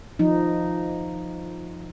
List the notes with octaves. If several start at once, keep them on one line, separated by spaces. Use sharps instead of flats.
F3 D#4